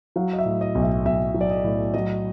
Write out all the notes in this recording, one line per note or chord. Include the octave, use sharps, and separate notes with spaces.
F#3 F5
D#5
E5
A2
D#5
B1
E5
B1 E5
F#3
D5
D#5
A2
F#3 D#5